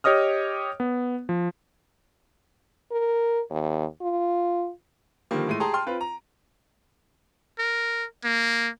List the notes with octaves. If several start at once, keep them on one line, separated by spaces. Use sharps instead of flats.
G4 C#5 D#5 D#6 F6
B3
F3
A#4
D#2
F4
D3 D#3 F3 G3 A#3
A2 G#3 A3 D#7
G4 G#4 G5 A5 A#5 C6
G5 A5 C6 F6
C4 F4 B4
A#5
A#4
A#3